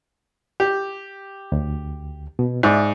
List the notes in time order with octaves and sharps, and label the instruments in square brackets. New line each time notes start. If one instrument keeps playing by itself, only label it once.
[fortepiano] G4
[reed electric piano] D2
B2
[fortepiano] G#2 [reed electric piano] D5 E5